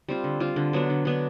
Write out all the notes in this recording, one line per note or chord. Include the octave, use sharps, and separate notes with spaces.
G3 C4 F4
D3
G3 C4 F4
D3
F#3 B3 D4
D3
F#3 B3 D4